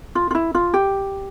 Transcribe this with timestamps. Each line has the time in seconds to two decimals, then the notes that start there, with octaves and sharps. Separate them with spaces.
0.15 F4
0.31 F4
0.35 E4
0.55 F4
0.74 G4